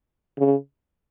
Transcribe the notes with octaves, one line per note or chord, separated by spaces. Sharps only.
C#3